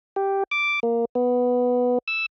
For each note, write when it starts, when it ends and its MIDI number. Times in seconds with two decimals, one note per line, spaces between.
0.16 0.43 67
0.51 0.80 86
0.83 1.05 58
1.15 1.98 59
2.08 2.26 88